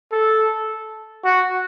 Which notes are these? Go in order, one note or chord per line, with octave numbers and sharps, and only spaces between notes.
A4
F#4